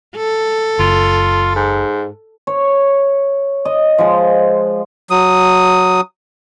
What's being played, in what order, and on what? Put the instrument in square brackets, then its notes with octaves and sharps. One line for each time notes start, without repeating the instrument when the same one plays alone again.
[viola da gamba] A4
[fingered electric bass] F#1 [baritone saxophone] F4
[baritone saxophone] G#2
[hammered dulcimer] C#5
D#5
F3 G#3
[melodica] F#3 D#6